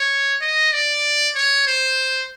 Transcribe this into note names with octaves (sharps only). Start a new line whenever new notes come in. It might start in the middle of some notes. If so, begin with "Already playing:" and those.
Already playing: C#5
D#5
D5
C#5
C5